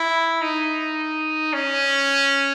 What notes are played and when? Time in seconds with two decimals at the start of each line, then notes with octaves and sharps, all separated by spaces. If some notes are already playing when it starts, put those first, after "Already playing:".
Already playing: E4
0.41 D#4
1.53 C#4